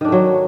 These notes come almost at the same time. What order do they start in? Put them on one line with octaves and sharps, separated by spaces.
D#3 D4 A3 F#3